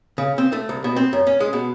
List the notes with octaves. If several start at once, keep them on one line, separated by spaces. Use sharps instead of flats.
C#3
C4
A3
C2
B2
C4
F#2
C#4
G#3
B2